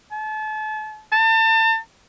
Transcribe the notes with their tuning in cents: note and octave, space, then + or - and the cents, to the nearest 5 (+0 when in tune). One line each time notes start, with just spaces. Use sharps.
A5 -35
A5 +30